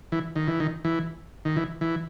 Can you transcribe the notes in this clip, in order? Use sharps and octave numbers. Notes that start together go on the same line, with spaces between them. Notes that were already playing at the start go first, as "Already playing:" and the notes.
E3
D#3
E3
D#3
E3
D#3
E3
E3